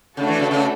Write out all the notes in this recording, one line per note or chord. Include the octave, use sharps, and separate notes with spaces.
C#3 A3 D4 F#4 A4
E3
C#3
C#3